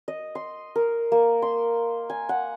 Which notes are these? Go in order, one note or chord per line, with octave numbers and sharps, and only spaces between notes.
D#5
C6
A#4
A#3
C6
G#5
F#5